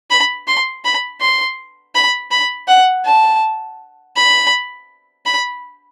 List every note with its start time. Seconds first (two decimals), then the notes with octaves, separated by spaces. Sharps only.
0.11 B5
0.48 C6
0.85 B5
1.21 C6
1.95 B5
2.31 B5
2.68 F#5
3.05 A5
4.16 B5
5.26 B5